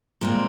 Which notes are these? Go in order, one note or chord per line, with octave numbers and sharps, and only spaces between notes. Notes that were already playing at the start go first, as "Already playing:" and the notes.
A#2 G#3 C4 F4